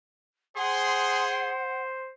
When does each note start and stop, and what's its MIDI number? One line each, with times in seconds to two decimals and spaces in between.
0.57 1.53 68
0.57 2.13 72
0.57 1.80 78
0.57 1.53 84